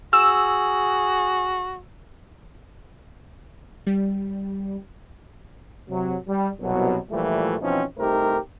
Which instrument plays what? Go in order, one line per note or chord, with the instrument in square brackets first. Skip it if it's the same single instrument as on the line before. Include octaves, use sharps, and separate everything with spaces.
[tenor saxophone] F#4 [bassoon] G#4 [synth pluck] E6
[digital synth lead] G3
[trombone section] C3 F#3
G3
C2 B2 F#3
A#2 E3 F3 G3 A3
B2 E3 F3 C4 C#4 D#4
C2 A3 D#4 G4 A#4 C5